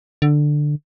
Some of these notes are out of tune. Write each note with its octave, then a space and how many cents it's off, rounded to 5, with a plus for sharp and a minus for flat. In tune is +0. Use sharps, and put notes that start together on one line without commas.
D3 +10